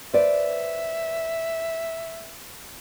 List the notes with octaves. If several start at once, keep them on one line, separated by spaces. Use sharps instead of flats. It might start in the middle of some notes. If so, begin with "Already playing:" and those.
B4 C5 D5 E5